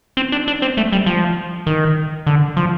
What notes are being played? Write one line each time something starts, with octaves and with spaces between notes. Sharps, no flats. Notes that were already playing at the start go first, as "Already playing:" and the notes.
C4
D4
D4
C4
A3
G3
F3
D#3
D3
F3